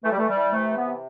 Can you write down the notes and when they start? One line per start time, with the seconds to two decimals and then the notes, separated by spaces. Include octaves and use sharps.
0.03 E3 A3
0.11 G3
0.18 E3 A3
0.29 G3
0.36 E3
0.52 C3 A3
0.69 E3
0.77 B3
0.86 C3